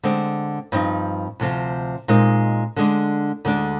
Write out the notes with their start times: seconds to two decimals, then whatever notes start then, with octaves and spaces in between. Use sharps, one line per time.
0.03 D3 G#3 C4
0.72 G2 F3 C4 D#4
1.40 D2 C3 F3 C4
2.08 A#2 G#3 C4 D#4
2.76 D3 G#3 D4
3.45 D2 D3 G#3 D4